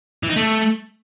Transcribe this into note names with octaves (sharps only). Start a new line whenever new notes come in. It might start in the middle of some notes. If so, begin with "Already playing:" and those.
E3
D#4
A3